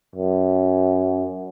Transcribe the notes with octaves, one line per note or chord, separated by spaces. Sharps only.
F#2